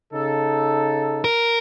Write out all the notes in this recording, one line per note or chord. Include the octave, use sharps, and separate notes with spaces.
C#3 D#4 A4
A#4